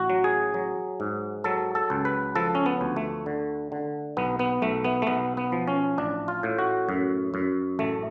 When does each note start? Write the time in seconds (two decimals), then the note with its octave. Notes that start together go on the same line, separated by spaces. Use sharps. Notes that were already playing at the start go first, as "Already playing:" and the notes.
Already playing: A1 F#4
0.10 F#3
0.24 G#4
0.54 F#3
1.00 G#2
1.44 F#3 A4
1.75 A4
1.90 C#2
2.05 B4
2.36 F3 A4
2.55 C#4
2.66 B3
2.81 D2
2.96 A3
3.26 D3
3.72 D3
4.17 B1 B3
4.39 B3
4.62 B1 A3
4.84 B3
5.02 A3
5.07 B1 B3
5.37 B3
5.52 F3
5.68 C#4
5.98 A1 D4
6.28 F4
6.43 A2
6.58 F#4
6.89 F#2
7.34 F#2
7.79 A1 A3